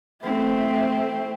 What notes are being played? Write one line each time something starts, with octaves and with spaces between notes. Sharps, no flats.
A3 C4